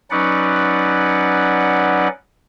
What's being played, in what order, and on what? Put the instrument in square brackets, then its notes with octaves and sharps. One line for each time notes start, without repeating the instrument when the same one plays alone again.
[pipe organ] F#3 C#4 D#4 B4 D5 F#5